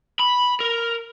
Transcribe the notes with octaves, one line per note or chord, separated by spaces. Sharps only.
B5
A#4